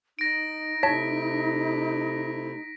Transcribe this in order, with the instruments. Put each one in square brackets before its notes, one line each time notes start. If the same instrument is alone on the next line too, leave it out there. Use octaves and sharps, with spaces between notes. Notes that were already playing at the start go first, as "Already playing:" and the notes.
[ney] D#4 [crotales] A#6 D7
[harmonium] C3 A3 E4 [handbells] C#5 A5 [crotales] B6